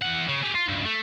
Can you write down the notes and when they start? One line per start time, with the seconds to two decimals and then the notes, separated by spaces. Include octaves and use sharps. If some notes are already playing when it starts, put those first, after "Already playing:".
0.02 E2 F#5
0.28 C#3
0.42 G4 G#4
0.55 F4
0.68 C#2 G2
0.85 A3